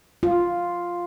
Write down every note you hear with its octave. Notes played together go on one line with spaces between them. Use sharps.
F4